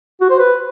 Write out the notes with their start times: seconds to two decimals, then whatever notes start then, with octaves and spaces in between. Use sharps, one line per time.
0.21 F#4
0.30 C5
0.39 B4